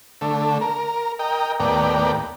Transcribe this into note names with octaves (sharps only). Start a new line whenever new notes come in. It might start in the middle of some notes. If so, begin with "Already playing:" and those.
D3 A3
A#4
A#4 D#5 G5
D#2 A2 B3 A#4 D5 G5